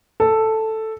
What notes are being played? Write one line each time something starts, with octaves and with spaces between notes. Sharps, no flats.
A4